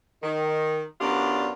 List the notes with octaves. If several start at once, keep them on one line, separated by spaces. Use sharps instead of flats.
D#3
F#2 B3 D4 F4 G4 D5